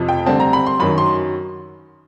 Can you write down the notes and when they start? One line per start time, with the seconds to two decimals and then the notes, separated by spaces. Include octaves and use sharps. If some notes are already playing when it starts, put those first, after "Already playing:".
Already playing: F2 C3 F3
0.08 G5
0.26 D3 G3 C4 A5
0.40 A#5
0.53 B5
0.67 C6
0.80 F#2 D#3 F#3 B5
0.98 C6